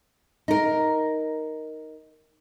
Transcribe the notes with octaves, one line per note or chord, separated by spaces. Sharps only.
D#4 A#4